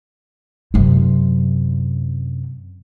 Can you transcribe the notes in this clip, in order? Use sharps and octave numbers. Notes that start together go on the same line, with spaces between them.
F#2 C3